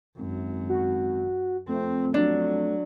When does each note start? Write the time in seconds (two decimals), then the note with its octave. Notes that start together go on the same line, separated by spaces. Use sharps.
0.18 G#1 F#2
0.69 F#4
1.69 F2 A3 C4
2.14 F#3 D4